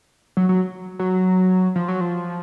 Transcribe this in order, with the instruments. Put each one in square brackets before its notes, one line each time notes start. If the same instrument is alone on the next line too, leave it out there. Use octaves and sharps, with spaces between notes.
[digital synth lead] F#3
F#3
F#3
F3
F#3
F3